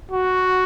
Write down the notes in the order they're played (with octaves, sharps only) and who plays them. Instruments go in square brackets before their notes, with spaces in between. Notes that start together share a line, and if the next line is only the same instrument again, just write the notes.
[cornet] F#4